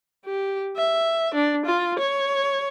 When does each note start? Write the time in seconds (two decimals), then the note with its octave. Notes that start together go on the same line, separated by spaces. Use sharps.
0.25 G4
0.77 E5
1.34 D4
1.66 F4
1.99 C#5